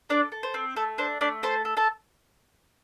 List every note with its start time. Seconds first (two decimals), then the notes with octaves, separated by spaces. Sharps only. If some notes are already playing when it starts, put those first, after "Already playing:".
0.09 D4 A4 D5
0.32 A4
0.43 C5
0.54 C4
0.76 A3 A4
0.98 D4 C5
1.21 A3 D4 D5
1.43 A4 C5 C6
1.65 A4
1.77 A4 A5